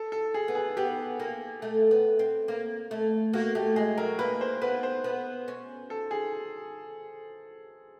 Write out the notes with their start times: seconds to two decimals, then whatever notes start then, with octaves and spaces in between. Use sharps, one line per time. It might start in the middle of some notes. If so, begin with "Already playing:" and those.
Already playing: A4
0.12 A4
0.34 G#4
0.48 B3
0.55 G#4
0.77 B3 G4
1.20 A#3
1.62 A3
1.91 B3
2.19 C4
2.48 A#3
2.91 A3
3.33 A#3 F#4
3.55 A3 G4
3.76 G#3 G#4
3.98 F#3 A#4
4.19 A#3 B4
4.41 C5
4.62 B3 B4
4.83 C5
5.04 B3
5.48 C#4
5.90 A4
6.11 G#4